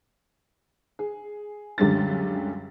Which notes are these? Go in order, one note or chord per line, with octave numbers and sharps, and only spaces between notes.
G#4
C#2 F#2 D3 G3 G#4 A6